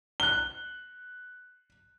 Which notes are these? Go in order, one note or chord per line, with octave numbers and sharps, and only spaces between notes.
F#6 G7